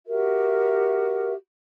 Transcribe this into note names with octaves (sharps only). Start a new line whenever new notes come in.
F#4 G4 A#4 E5